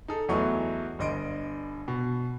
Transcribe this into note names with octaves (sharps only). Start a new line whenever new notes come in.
D#4 G#4 A4
E2 E3 F#3 A3 D#5 C#6
G1 G2 D#5 C6 D7
B2